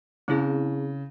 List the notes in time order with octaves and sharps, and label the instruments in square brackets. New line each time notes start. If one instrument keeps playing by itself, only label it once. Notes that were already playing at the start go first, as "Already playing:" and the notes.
[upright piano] C#3 [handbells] C4 E4 G#4